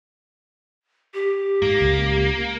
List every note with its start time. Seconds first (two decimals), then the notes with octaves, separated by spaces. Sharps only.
1.14 G4
1.62 G#2 A#3
1.81 C#2